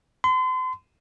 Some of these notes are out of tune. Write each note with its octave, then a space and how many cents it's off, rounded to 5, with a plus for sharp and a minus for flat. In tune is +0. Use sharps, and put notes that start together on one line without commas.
C6 -40